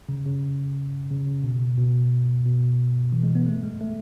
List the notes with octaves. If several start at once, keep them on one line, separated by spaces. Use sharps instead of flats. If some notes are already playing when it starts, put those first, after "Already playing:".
C#3
C#3
C#3
C#3
B2
B2
B2
E3
G#3
B3
A3
G#3
A3